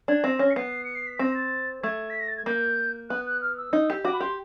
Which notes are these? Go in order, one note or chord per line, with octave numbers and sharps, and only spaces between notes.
D4 G#6
C4 A#6
C#4 A#6
C#7
B3 C7
C#7
C7
B6
C4 A#6
A6
A3 G#6
B6
A#6
A6
G#6
A#3 G6
B3 F#6
F#6
F6
E6
D#4
G4
F#4 D6
B5
G4 C6